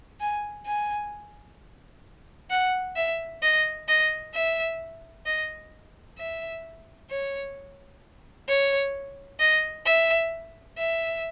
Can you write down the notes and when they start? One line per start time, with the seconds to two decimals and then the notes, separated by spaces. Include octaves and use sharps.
0.20 G#5
0.66 G#5
2.50 F#5
2.96 E5
3.42 D#5
3.88 D#5
4.35 E5
5.26 D#5
6.18 E5
7.10 C#5
8.48 C#5
9.40 D#5
9.86 E5
10.78 E5